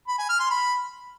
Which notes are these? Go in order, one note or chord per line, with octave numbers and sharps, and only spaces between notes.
B5
G#5
F6
C6
B5